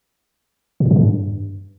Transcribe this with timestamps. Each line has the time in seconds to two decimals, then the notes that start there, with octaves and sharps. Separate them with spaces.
0.80 A#2
0.86 G2
0.91 C3
0.96 C#3
1.01 G2